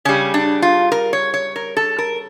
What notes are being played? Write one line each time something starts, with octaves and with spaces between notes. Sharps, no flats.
C#3 G3 C#4
D4
F4
A#4
C#5
C#5
A#4
A4
A#4